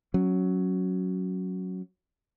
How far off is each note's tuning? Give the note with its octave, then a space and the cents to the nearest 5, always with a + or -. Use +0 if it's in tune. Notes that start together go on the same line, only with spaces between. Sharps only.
F#3 +0 C#4 +0